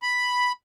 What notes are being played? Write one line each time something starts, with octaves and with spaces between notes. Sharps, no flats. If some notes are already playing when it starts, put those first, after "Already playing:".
B5